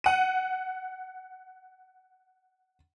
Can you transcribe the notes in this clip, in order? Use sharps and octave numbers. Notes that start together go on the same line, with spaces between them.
F#5 D#7